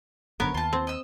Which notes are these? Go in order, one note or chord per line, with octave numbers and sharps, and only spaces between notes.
G1 F#2 D3 B3 A#4 C#5
D#2 F4 A5
C4
D#5 E6